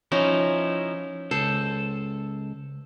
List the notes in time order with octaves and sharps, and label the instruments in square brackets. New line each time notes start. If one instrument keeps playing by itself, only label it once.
[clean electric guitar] F3 D#4 E4 [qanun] C#4
[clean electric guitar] C#2 A4 [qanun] C5